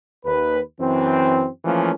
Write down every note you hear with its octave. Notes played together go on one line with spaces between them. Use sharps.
D#2 B4
F#2 E3 C4
E3 F3 A3 A#3 C#4